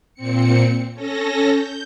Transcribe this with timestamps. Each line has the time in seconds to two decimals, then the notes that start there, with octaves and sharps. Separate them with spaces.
0.14 A#2 C4 C#7
0.93 C#4 A4 A#6
1.51 G6